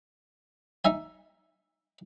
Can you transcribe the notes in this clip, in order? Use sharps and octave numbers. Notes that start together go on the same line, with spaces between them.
D#4 E5 G#5